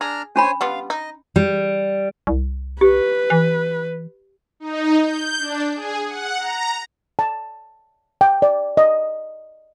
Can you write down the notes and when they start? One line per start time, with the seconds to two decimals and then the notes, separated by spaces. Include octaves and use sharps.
0.01 D4 G#4 A#5 F6
0.36 C#4 D4 C5 C#5 G#5 B5
0.61 G3 B3 F4 F5
0.90 D#4 D#5
1.36 G3
2.27 C2
2.81 G4 B4
3.30 E3
4.60 D#4
5.02 G6
5.39 D4
5.76 G#4
6.06 F#5
6.38 A#5
7.19 A5
8.21 G5
8.42 D5
8.77 D#5